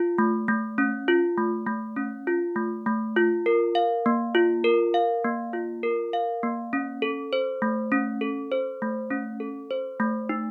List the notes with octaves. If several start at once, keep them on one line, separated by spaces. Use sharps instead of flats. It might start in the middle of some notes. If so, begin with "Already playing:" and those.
Already playing: F4
A3
A3
C#4
F4
A3
A3
C#4
F4
A3
A3
F4
A#4
F5
A#3
F4
A#4
F5
A#3
F4
A#4
F5
A#3
C#4
A4
C5
A3
C#4
A4
C5
A3
C#4
A4
C5
A3
D#4